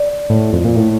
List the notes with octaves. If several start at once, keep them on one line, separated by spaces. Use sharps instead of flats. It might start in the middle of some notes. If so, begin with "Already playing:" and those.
Already playing: D5
A2
F2
A#2
A2